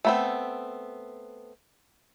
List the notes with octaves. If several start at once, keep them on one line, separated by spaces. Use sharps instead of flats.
A3 B3 C4